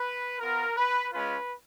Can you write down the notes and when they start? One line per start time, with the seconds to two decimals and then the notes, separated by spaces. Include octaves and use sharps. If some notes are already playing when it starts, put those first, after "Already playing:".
Already playing: B4
0.39 B3 F4 A#4
0.76 B4
1.12 G#3 C#4 F4 B4